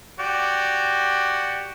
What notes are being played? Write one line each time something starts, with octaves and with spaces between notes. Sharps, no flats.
F#4 G4 D5